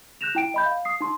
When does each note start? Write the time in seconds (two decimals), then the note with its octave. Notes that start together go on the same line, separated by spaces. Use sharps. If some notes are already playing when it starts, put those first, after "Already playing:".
0.21 F#6 G6 A#6 E7 F7
0.35 E4 G5 D7
0.54 D#5 B5 G6
0.65 F5
0.85 D#6 C7
1.00 D#4 C6